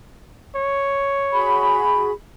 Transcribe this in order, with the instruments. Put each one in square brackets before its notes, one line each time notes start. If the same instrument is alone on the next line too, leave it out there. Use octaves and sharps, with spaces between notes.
[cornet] C#5
[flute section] F#4 G#4 B5